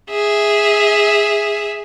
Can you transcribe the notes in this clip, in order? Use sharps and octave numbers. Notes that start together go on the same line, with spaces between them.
G#4 E5